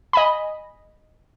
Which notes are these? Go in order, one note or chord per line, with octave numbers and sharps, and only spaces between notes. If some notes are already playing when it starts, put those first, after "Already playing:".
D#5 G#5 B5